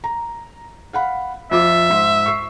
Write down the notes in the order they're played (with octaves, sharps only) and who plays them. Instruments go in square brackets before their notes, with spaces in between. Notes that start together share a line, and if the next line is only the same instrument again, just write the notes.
[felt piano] A#5
F5 F#5 B5
[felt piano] F2 F4 D6 [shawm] E5
[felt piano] G#2 C6 B6
C#6 E6 C7